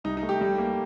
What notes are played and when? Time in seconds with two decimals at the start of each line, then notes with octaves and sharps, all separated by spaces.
0.04 C2 D#4
0.17 D#4
0.23 A3
0.29 G4
0.41 G3
0.58 A#3